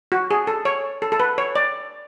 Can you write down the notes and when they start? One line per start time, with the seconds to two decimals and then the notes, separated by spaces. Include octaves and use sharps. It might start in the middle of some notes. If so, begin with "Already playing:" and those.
0.12 F#4
0.31 G#4
0.47 A4
0.65 C#5
1.02 A4
1.12 A4
1.20 B4
1.38 C#5
1.56 D5